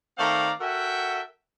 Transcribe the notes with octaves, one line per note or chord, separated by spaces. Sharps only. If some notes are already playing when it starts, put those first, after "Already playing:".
D#3 A3 C4 D5 F5 A#5
F#4 A4 A#4 E5 F#5 G5